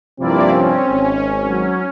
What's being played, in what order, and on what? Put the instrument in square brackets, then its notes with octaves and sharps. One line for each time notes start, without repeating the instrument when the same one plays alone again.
[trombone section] G2 C3 F3 [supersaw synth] A#3 E4 D5 [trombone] C4
[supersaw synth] C#4
[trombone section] G#1
[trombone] F#3